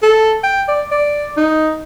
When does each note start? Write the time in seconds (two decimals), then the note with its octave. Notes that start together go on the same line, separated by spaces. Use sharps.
0.03 A4
0.44 G5
0.68 D5
0.91 D5
1.37 D#4